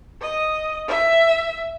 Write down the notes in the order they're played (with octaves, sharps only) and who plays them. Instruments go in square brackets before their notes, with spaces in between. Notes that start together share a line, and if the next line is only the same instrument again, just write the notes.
[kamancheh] D#5
E5